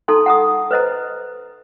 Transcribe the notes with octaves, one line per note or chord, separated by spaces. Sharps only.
D#4 A4 A5 A#5 C6
F#5 A#5 D#6
B4 C5 D#5 A#5